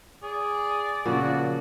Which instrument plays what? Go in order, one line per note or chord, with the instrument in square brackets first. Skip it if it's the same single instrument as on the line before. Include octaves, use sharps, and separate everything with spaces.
[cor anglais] G#4 [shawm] D5
[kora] A#2 [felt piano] C#3 F3 [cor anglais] F#4